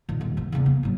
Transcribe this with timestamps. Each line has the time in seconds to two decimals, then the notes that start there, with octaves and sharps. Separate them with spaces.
0.09 A#2 D#3
0.21 D#1
0.37 G#2 E3
0.52 E2 C#3
0.66 A#3
0.83 G#2 F#3